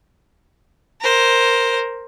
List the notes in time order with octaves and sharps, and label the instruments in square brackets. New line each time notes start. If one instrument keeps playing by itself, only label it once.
[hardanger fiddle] A#4 C5